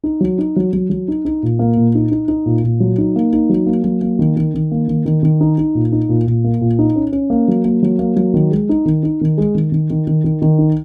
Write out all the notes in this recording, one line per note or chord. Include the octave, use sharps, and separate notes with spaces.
D#4
F#3
D#4
F#3
F#3
F#3
D#4
D#4
A#2
A#3
A#2
D#4
D#4
D#4
A#2
A#2
F#3
D#4
A#3
D#4
F#3
A#3
F#3
A#3
D#3
D#3
D#3
A#3
D#3
D#3
D#3
D#4
D#4
A#2
D#4
A#2
A#2
A#3
A#2
D#4
C#4
C#4
A#3
F#3
A#3
F#3
A#3
F#3
D#3
G#3
D#4
D#3
D#4
D#3
G#3
D#3
D#3
D#3
D#3
D#3
D#3
D#4